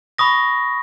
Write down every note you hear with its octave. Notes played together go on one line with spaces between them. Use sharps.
B5 C#6 D#6 A#6